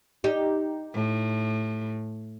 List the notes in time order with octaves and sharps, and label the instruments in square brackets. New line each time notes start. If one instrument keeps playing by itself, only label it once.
[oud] D#4 G4
[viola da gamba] A2